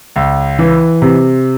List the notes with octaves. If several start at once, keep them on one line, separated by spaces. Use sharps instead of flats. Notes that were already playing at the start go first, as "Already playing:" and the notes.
C#2
E3
C3